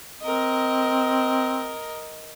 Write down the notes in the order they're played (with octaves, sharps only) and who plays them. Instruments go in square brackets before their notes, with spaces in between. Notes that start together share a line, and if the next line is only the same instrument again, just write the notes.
[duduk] C4 [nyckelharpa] A#4 D#5